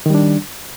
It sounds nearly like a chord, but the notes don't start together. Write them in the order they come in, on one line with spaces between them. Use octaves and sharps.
D#3 G3 D4